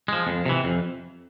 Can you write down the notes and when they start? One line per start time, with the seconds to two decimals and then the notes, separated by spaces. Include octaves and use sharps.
0.08 F3 G#3
0.27 F2
0.46 C3 E3
0.64 F2